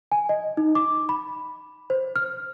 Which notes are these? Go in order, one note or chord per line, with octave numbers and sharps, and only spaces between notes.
G#5
D#5
D#4
D6
B5
C5
F6